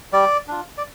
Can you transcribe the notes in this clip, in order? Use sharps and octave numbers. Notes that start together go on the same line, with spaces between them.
G3 D5
D4 F4
D5